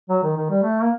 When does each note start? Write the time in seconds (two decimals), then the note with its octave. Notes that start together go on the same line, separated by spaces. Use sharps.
0.09 F#3
0.24 D#3
0.36 D#3
0.50 G3
0.63 A3
0.82 A#3